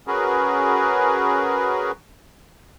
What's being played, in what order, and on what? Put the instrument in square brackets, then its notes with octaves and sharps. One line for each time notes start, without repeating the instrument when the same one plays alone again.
[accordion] C#4 F#4 G#4 A#4 B4